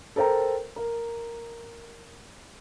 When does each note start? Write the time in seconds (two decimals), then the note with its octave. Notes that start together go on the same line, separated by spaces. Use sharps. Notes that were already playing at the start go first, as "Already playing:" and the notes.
0.16 A4 A#4 C5 G5 A#5
0.76 A#4